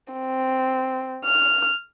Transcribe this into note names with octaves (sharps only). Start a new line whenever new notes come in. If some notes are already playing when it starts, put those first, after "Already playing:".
C4
F6